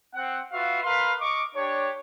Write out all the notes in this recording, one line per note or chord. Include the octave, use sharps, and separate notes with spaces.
C4 F#5
F4 F#4 B4 E5 F5
A#4 B4 F5 B5 C6
D#5 C#6 D6
D4 G4 C#5